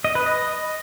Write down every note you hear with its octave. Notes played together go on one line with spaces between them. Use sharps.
D#5
B4
D#5